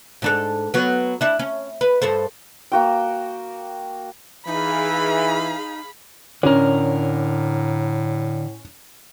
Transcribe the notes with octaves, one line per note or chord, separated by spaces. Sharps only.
G#2 D4 A4
F#3 B3
D4 E4
C#4
B4
G2 A4 C5
A#3 F#4 G5
E3 D#4 G#4 F5 B5
A2 D3 C#4 A#4